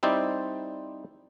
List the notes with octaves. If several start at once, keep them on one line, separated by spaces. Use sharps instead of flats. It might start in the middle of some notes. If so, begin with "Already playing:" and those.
G3 C4 D#4 E4 C5 D5